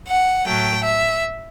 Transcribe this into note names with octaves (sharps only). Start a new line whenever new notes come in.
F#5
A2 F#3 A3 G5
E5